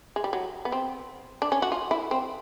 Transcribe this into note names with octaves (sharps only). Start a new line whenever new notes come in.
G#3
G3
F#3
B3
C4
D4
C#4
F#4
F4
E4
C4